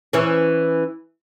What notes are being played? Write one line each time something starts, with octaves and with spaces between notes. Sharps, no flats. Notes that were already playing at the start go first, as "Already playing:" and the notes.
E3 C#4